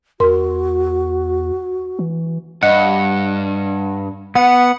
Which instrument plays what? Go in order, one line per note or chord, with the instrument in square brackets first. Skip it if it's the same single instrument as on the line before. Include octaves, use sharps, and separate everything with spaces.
[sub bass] E2 [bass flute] F#4 [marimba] A#4 C6
[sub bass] E3
[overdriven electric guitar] G2 [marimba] D#5 [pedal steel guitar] F#5
[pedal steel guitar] B3 [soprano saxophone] F#5